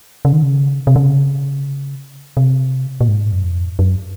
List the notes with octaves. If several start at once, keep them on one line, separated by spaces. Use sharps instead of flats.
C#3
D#3
C#3
C3
C#3
C3
A#2
G#2
F#2
F2
F#2